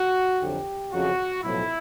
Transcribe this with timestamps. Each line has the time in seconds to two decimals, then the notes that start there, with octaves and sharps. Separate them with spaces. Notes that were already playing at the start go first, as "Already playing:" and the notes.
Already playing: F#4
0.40 F2 D3 F#3 G4
0.92 F2 C#3 F#3 F#4
1.44 B1 A2 F3 E4